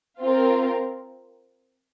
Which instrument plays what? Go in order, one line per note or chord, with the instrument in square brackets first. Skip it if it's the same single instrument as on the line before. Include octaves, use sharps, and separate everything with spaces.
[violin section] C4 F4 A#4